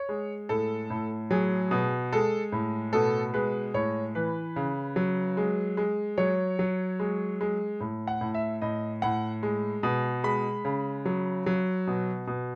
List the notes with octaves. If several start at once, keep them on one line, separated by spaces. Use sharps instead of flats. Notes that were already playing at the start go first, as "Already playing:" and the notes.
Already playing: C#5
G#3
A2 A4
A2
F#3 G#4
B2
G#3 A4
A2
B2 A4
G#3 B4
A2 C#5
E3 B4
C#3
F#3
G#3
G#3
F#3 C#5
F#3
G#3
G#3
A2
F#5
A2
E5
A2 D#5
A2 F#5
G#3
B2
G#3 B5
C#3
F#3
F#3
B2
B2